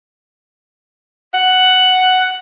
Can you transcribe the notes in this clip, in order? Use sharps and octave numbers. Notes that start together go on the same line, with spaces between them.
F#5